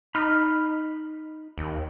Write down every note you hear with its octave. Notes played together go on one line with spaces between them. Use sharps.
D#4 B5 F6
D#2